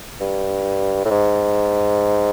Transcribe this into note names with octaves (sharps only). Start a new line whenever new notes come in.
G2
A2
G#2